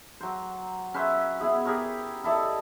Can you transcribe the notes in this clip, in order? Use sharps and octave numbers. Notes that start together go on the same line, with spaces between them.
F#3 C5
C#4 B4 C5 E5
B3 E4 G#4
G4 G#4 A#4 C#5
E4 A4 D5 D#5